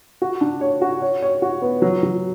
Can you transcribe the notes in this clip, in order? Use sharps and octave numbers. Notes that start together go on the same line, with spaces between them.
F#4
D4
C#5
F#4
C#5
C#5
F#4
B3
F#3
F#3